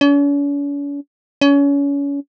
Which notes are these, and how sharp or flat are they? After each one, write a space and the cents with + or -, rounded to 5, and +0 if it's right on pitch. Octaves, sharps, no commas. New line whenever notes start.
C#4 +45
C#4 +30